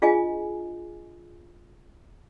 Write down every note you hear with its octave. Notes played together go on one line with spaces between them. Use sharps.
D4 F4 G#4 D#5 F5 G#5